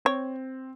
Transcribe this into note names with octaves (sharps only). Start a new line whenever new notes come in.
C4 C#5